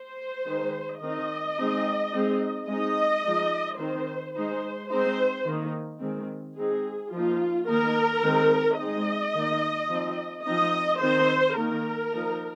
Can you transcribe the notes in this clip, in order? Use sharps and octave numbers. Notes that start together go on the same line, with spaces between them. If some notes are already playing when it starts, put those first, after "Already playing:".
Already playing: C5
D#3 G#3 D#4
D#3 C4 D#4 D#5
G#3 C4 D#4
G#3 C4 D#4
G#3 C4 D#4 D#5
F3 G#3 D#4
D#3 C4 D#4 C5
G#3 D#4 C5
G#3 C4 D#4 C5
D#3 A#3 D#4
D#3 G#3 C4
G#3 C4 D#4 G#4
F3 A#3 D#4 F4
D#3 A#3 D#4 A#4
D#3 G#3 C4 D#4
G#3 C4 D#4 D#5
D#3 A#3 D#4
F3 C4 D#4
F3 C4 D#4 D#5
D#3 C4 D#4 C5
D#3 A#3 D#4 A#4
F3 A#3 D#4